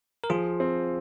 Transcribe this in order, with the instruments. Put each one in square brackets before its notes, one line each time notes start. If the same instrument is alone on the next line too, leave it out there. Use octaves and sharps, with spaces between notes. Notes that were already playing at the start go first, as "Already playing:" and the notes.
[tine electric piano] A#4
[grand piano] F3 [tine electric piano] F4 G#4
[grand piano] C4